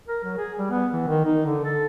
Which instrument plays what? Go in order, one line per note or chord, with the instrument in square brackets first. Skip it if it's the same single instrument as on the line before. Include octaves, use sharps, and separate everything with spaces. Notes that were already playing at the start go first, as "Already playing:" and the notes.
[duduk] A#4
F#3
G#4
G3
B3
E3
D#3
D#4
D3
A4